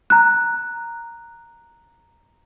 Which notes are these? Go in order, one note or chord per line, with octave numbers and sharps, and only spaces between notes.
A#5 F#6